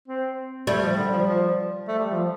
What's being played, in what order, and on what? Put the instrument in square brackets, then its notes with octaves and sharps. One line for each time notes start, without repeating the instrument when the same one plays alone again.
[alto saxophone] C4
[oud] G3 [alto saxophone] A3
[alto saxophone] F3
D3
F3
F3
A3
G3
F3